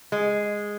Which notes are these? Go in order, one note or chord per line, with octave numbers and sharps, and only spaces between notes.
G#3